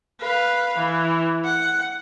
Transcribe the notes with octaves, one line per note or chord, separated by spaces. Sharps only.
B4 F5
E3
F#5